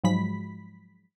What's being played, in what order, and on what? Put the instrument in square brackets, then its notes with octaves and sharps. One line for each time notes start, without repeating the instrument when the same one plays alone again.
[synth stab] G#2 F3 F#3 G#3 B5 B6